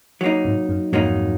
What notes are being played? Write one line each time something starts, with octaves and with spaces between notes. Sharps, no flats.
F#3 A#3 D#4
G#2 C3
F#2
F2 G#2 F#3 A#3 D#4